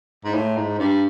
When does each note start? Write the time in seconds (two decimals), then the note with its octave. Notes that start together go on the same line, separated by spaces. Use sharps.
0.25 G#2
0.34 A2
0.57 G#2
0.79 G2